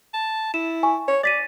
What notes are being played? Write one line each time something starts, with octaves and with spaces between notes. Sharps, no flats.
A5
E4 E7
G#5 C#6
C#5 C#6
D5 A6 B6 D#7